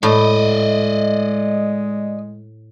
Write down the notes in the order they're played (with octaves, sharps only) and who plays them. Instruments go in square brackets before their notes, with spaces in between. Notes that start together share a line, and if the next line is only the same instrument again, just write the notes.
[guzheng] A2 [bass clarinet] G#3 [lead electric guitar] D5 D#5